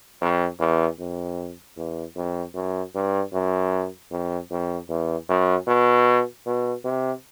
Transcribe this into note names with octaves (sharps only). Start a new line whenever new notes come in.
F2
E2
F2
E2
F2
F#2
G2
F#2
F2
F2
E2
F#2
B2
B2
C3